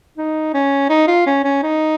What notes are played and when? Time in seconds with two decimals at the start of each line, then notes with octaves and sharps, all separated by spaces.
0.17 D#4
0.54 C#4
0.89 D#4
1.07 F4
1.26 C#4
1.44 C#4
1.63 D#4